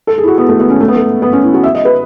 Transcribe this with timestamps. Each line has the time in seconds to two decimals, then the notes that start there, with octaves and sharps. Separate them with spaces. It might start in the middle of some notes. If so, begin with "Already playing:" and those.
0.07 A4
0.18 G#4
0.23 E4
0.28 F#4
0.38 B3
0.49 A3
0.60 B3
0.70 C#4
0.80 A3
0.88 B3
0.96 A3
1.22 B3
1.33 C#4
1.44 E4
1.54 F#4
1.64 E5
1.75 D#5
1.85 B4